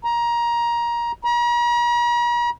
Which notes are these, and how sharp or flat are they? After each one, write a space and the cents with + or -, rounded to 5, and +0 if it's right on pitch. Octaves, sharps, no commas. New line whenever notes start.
A#5 +20
A#5 +45